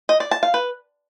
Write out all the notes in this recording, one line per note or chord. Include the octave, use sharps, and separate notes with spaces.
D#5
D5
A5
F5
B4